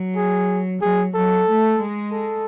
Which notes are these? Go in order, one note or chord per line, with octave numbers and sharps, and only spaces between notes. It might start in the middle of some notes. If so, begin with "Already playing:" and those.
Already playing: F#3
G#4
F#3 G#4
F#3 A4
A3
G#3
A4